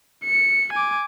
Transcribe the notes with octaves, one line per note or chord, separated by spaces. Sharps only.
C#7
G#5 D6